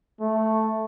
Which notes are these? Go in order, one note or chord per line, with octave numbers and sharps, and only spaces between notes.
A3